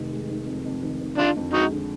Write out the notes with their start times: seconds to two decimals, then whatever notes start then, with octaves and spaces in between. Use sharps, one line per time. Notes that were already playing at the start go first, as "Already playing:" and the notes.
Already playing: F1 D#3
0.12 G#3
0.29 D#3
0.47 F2
0.65 F2
0.82 D#3
1.01 D#3
1.18 D3 D4 F4
1.36 F2
1.53 G#3 D#4 F#4
1.72 D3